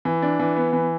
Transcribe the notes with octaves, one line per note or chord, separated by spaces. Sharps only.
E3
D4
E3
B3
E3